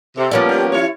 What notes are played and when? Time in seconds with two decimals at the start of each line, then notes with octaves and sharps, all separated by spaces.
0.17 C3 A4
0.31 F3 G3 A#3 B3 C#4 D5
0.49 G4
0.72 E4 C#5